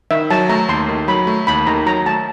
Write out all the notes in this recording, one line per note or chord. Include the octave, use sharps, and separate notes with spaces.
D#3 E5
F#3 A5
A3 A#5
D#2 C6
D#3
F#3 B5
A3
D#2 B5
D#3 A#5
F#3 A#5
A3 A5